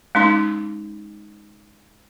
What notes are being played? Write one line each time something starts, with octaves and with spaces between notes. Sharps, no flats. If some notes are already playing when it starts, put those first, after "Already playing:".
G#3 C#4 D#4 C6